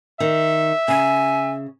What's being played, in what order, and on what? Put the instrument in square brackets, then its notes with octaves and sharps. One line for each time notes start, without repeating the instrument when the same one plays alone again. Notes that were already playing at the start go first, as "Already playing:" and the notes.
[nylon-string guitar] D#3 [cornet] E5
[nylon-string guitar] C#3 [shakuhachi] G#5